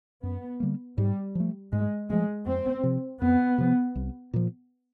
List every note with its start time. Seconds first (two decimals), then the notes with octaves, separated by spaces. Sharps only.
0.23 F#2 B3
0.60 D3 G3 A#3
0.98 G#2 G3
1.35 F3 A3
1.72 G#2 G#3
2.10 F3 G#3 A3
2.46 F2 C4
2.83 C3 F3
3.21 F2 B3
3.58 C3 F3
3.95 C2
4.34 A#2 F3